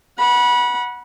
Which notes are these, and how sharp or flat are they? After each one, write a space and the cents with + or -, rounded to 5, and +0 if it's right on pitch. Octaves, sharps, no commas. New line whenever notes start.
F#5 -5 B5 -30